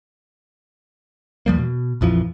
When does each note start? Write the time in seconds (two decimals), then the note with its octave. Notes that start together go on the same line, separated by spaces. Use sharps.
1.46 E2 F3 G3 A#3
1.58 B2
2.01 A#1 F2 E3 F3